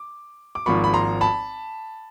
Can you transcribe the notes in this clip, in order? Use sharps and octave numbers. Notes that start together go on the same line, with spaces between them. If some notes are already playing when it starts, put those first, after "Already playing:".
Already playing: D6
D6
G#1 G#2 F3 A#3 B5 C#6
B5
A#5 C6
A5 B5